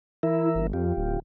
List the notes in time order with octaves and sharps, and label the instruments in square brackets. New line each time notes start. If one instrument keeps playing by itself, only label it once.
[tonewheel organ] E3 A#4 E5 [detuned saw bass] E4
[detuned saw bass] G1
[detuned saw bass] F2 [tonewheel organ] F4 G4
[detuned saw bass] D1